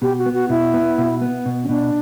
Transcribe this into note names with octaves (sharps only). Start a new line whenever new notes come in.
B2 G4
F#4
B3
F#4
B2 E4
B3
B2
B3
B2
C#4
B2 D4